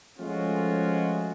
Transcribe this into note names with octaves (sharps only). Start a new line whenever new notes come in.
F3 G#3 A3 C#4 F4 F#4